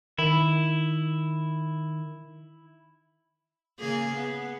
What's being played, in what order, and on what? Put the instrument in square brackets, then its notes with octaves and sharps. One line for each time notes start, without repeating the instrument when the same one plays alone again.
[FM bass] D#3 [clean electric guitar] E4
[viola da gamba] C#3 A#3 G#4
B3